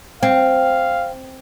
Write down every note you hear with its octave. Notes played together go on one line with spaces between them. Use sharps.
C4 F5